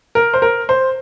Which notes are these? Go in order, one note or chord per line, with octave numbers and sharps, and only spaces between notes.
A#4
C5
A#4
C5